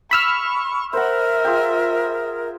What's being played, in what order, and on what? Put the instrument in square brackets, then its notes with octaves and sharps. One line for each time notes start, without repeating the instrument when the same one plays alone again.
[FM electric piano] B5 E6 F6 [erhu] C#6
[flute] A#4 [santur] C5 F#5 [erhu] E5
[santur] F4 G#4 G5